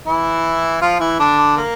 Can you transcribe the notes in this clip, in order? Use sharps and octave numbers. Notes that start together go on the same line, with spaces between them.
E3 E4
F3 F4
E3 E4
D3 D4
A#3